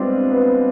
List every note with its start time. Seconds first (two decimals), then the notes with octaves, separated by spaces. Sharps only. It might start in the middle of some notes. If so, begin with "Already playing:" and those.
Already playing: G3 G#3 B3 C4 D4 F4
0.29 B3